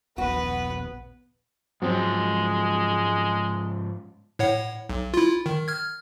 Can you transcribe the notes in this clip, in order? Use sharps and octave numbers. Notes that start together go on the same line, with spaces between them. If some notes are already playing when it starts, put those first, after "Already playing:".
D#1 A#1 B3 F#4 B4
G#2 F3 F#3 G#3 C4 F#4
A2 C#5 F#5
B1
E4 F4
D#3
F6 G#6